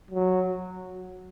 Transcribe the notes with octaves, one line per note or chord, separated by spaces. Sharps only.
F#3